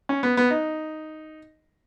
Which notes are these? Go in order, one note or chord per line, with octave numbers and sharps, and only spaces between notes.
C#4
B3
B3
D#4